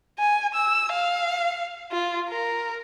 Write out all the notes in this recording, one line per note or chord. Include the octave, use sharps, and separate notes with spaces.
G#5
E6
F5
F4
A#4